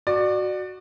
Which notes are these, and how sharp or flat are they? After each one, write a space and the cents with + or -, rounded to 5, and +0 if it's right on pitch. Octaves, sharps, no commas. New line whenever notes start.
F#4 +0 D5 +25